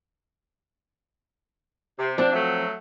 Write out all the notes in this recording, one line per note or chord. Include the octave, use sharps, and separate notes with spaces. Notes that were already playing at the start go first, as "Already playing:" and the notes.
C3
F3 C4 D4
F#3 A3